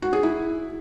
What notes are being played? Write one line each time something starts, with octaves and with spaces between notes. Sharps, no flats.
F#4
G#4
E4